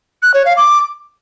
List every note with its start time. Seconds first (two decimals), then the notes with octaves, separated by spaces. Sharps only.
0.23 F#6
0.34 C#5
0.45 F5
0.57 D6